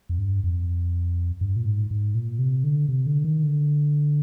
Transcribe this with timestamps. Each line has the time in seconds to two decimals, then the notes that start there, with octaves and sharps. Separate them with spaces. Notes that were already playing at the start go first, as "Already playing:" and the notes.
0.09 F2
0.18 G2
0.44 F2
1.41 G2
1.56 A#2
1.66 G#2
1.91 G#2
2.15 A#2
2.39 C3
2.64 D3
2.89 C3
3.06 D3
3.24 D#3
3.43 D3